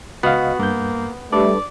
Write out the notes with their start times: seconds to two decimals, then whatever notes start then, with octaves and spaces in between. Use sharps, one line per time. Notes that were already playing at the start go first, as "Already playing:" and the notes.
0.23 C#2 B3 F#4 D#5 F5
0.59 G2 A#3 G6
1.32 G3 A3 D4 A4 B4 D5